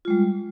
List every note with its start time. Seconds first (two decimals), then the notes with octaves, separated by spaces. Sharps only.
0.05 F4
0.08 G#3
0.10 G3